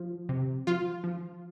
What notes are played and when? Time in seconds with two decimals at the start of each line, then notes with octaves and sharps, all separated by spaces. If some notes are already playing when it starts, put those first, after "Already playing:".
Already playing: F3
0.29 C3
0.67 F3 F4
1.04 F3